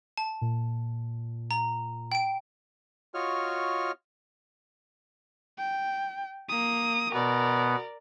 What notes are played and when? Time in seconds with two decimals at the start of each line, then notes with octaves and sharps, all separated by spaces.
0.17 A5
0.42 A#2
1.51 A#5
2.12 G5 D7
3.14 F4 F#4 C#5 D#5 F6
5.58 G5
6.49 A#3 D#6
7.13 B2 B3 A#4 D5